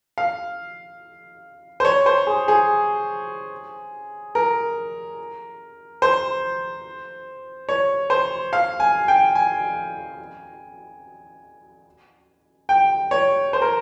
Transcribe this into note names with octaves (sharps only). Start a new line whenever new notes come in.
F5
C5
C#5
C5
G#4
G#4
A#4
C5
C#5
C5
F5
G#5
G5
G#5
G5
C#5
C5
A#4